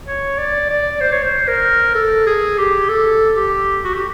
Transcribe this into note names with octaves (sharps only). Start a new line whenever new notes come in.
C#5
D5
D5
C5
C#5
C5
A#4
A4
G#4
G4
A4
G4
F#4
G4